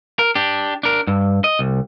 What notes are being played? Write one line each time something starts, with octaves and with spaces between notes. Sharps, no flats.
A#4
D4 G4
D4 A#4
G2
D#5
C2